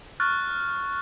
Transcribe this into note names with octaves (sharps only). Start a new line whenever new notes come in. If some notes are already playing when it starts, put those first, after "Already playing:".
C#6 F6 F#6 A6